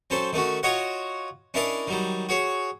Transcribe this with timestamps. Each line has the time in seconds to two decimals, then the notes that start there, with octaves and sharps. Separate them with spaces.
0.10 F#3 C#4 A4 C5
0.33 D#3 A3 C#4 F#4
0.63 F4 F#4 C#5 D#5 F#5
1.54 C#4 D4 E4 A#4 D#5 A5
1.87 D#3 F#3 G3
2.29 F#4 G#4 C#5